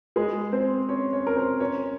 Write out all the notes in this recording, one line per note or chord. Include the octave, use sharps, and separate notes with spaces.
G#3 G#4
C4 C5
C#4 C#5
C#4 C#5
A#4
C4 C5
C#4 C#5